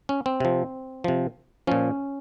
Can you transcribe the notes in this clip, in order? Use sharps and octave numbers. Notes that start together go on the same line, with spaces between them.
C#4
C4
C3 F3
C3 F3
A#2 F3 C#4